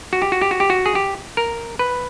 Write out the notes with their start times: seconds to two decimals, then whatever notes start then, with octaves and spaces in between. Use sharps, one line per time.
0.13 F#4
0.22 G4
0.32 F#4
0.41 G4
0.51 F#4
0.60 G4
0.70 F#4
0.86 G#4
0.95 G4
1.37 A#4
1.79 B4